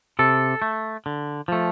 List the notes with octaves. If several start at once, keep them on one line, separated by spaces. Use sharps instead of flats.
C3 A4
A3
D3
F3 A3